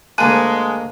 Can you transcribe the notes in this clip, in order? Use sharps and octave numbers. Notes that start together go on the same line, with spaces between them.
D2 G#3 A#3 G#5 A5 F#6 D#7